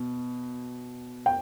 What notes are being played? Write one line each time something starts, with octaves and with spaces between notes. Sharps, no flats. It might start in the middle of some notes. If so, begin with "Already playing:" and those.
Already playing: B2
G5